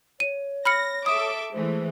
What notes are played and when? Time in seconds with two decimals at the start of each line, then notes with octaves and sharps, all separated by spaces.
0.20 C#5 D#7
0.65 B5 F6 A#6 C#7
1.06 A4 E5 D6 D#6
1.53 E3 G#3 A3 C5